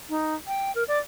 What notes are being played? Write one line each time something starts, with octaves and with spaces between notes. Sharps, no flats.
D#4
G5
A#4
D5